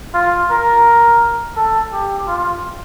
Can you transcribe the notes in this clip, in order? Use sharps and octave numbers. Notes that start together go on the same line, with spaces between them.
F4
A#4
A4
G4
F4